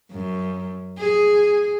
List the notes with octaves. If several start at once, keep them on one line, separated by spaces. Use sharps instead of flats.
F#2
G#4